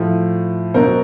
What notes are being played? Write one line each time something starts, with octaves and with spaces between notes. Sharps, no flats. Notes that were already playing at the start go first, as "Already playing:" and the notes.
Already playing: A2 F3
B2 F#3 A#4 C5